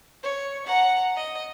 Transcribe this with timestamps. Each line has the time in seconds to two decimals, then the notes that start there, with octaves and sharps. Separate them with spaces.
0.23 C#5
0.66 F#5 A#5
1.16 D#5